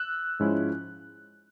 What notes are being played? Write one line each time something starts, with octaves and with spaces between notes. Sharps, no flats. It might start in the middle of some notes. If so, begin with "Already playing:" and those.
Already playing: E6 F#6
G#2 F3 G#3 C#4 E4